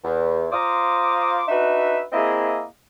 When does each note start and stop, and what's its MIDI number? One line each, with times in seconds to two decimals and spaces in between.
0.04 0.47 40
0.52 1.43 65
0.52 1.43 72
0.52 1.43 82
0.52 1.43 84
0.52 1.43 86
0.52 1.43 87
1.48 2.01 62
1.48 2.01 63
1.48 2.01 66
1.48 2.01 71
1.48 2.01 76
2.12 2.63 58
2.12 2.63 60
2.12 2.63 64
2.12 2.63 68
2.12 2.63 75
2.12 2.63 76